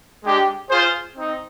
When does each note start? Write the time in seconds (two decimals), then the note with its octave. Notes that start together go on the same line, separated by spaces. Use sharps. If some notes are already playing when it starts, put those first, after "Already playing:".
0.24 G#3 D4 G4
0.70 F4 G#4 C5
1.16 C4 D#4